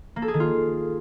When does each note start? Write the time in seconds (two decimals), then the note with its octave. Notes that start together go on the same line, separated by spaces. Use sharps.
0.16 A#3
0.22 A4
0.28 G#4
0.34 D#3
0.40 F4